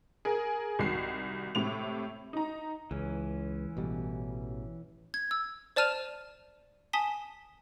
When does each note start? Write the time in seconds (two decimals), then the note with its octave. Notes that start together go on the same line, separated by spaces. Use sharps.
0.25 G#4 A#4
0.79 C2 D#3 F#4 C7
1.55 A2 C3 F7
2.33 D#4 A#5
2.91 C#2 E3 C#4
3.77 A1 B2 G3
5.14 G#6
5.31 E6
5.76 C5 D5 A5 F6 D#7 F7
6.93 G#5 A5 D#6 B6 G7